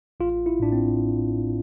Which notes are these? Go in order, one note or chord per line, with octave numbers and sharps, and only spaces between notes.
A1 F4
E4
A2 D4
C4